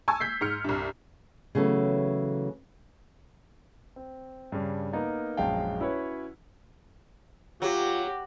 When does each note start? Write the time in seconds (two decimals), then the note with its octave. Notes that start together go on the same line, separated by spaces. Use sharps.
0.08 G#5 A5 C#6 E6 G#6
0.20 G6 B6 C7
0.41 G#2 F6 C#7
0.64 C2 G2
1.55 C#3 E3 F#3 A3 B3 A4
3.96 C4
4.52 G2 C#3 D4
4.93 A#3 B3 D#4 A#4
5.37 A#1 F#2 G#3 F5 G5 A5
5.80 C#4 E4 F#4 B4 C#5
7.62 F#3 F4 G4